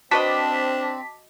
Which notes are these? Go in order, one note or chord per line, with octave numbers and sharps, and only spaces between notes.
C4 D4 F#4 B4 D#5 A5 D6 B6